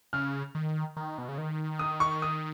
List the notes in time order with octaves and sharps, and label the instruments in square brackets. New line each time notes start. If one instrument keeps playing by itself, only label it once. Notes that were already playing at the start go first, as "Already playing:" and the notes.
[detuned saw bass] C#3 [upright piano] F6
[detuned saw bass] D#3
D#3
B2
C#3
D#3
[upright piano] D#6
C#6
D#6